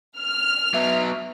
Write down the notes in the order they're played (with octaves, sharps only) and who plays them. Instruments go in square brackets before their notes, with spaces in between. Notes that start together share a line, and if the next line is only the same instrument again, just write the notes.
[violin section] F6
[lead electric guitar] F#3 B3 [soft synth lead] E5